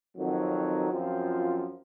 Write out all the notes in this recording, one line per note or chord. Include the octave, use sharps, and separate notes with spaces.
F2 D#3 F#3 C4
F#2 F3 C4 F4 C5